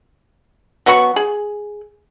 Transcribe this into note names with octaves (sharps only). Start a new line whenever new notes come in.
F#3 B3 F#4 C#6
G#4